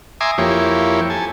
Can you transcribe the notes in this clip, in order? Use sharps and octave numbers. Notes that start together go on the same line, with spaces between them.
E5 G#5 A#5 C6 D6 D#6
F2 A#3 E4 G4 C#5
A4 G#5